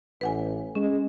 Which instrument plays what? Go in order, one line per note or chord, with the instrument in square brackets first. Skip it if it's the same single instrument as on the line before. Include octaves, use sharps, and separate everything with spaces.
[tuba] A1 [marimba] B4 F#5 G#5
[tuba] G#3 [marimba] C#4